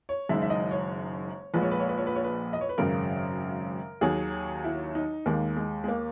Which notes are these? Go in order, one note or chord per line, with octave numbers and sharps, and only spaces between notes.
C#5
F#1 F#2 D#3 G#3 E5
E5
D#5
C#5
A#1 A#2 G#3 B4
C#5
B4
C#5
B4
C#5
B4
C#5
B4
D#5
C#5
B4
G#1 F#2 C#3 A#4
D#2 D#3 F#3 G#4
E4
D#4
D#2 D#3 G#3 A#3
G#3
G#3
A#3